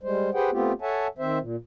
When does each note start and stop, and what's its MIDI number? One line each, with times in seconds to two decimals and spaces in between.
0.03 0.30 55
0.03 0.30 56
0.03 0.30 72
0.34 0.50 67
0.34 0.50 68
0.34 0.50 71
0.34 0.50 72
0.34 0.50 78
0.34 0.50 79
0.52 0.73 57
0.52 0.73 59
0.52 0.73 60
0.52 0.73 65
0.52 0.73 67
0.82 1.07 69
0.82 1.07 73
0.82 1.07 76
0.82 1.07 78
0.82 1.07 80
0.82 1.07 81
1.19 1.38 51
1.19 1.38 60
1.19 1.38 72
1.19 1.38 76
1.41 1.56 46